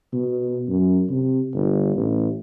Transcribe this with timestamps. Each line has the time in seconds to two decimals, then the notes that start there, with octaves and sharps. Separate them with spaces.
0.13 B2
0.68 F#2
1.10 C3
1.54 G1
1.96 A1